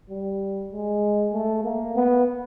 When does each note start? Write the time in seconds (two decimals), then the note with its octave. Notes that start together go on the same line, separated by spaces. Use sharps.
0.10 G3
0.71 G#3
1.33 A3
1.64 A#3
1.96 B3